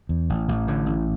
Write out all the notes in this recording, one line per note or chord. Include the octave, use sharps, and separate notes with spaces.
E2
A1
A1
A2 D3
A1